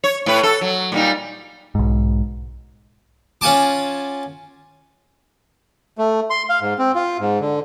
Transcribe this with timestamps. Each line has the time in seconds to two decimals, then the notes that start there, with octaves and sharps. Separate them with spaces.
0.04 C#5
0.26 A2 B4
0.43 A4
0.61 F#3
0.92 A#2 G3 D#4
1.75 B1 G#2
3.41 C#4 F4 F#5 G#5 A5 D6
5.98 A3
6.30 C6
6.49 F5
6.61 G#2
6.79 C4
6.95 F4
7.19 G#2
7.40 D3